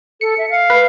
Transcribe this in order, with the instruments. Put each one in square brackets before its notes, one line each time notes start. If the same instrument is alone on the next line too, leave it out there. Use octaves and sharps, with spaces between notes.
[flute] A4 [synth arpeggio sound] C#7
[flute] E5
F5
[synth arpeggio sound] B4